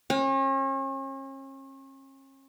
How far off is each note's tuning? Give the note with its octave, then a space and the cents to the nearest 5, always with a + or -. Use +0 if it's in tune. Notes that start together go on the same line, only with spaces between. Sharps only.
C#4 -40